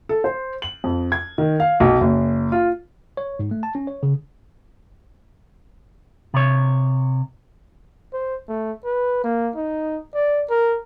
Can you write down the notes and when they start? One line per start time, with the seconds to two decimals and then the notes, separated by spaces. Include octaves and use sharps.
0.09 A4
0.24 C5
0.62 F#7
0.84 F2
1.12 G#6
1.38 D#3
1.60 F5
1.80 B1
2.01 F#1
2.52 F4
3.17 C#5
3.39 G#2
3.51 A3
3.63 A5
3.75 C#4
3.87 C#5
4.03 C#3
6.34 C3 C#5
8.13 C5
8.48 A3
8.84 B4
9.24 A#3
9.56 D#4
10.14 D5
10.50 A#4